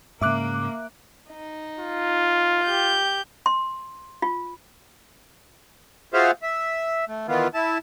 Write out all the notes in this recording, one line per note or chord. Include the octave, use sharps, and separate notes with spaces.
G#2 C#3 A#3 E5 D6 F#6
D#4
F4
G4 G6
C6
F4
F4 F#4 G#4 C5 E5 F5
E5
A3
D#3 E3 B3 F4
E4 A5